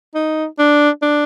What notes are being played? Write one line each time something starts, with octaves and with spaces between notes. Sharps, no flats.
D#4
D4
D4